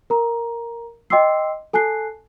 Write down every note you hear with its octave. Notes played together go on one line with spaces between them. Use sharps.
A#4 A#5
D#5 G5 C6 D6 E6 C7
A4 G#5 A5 F#6 C7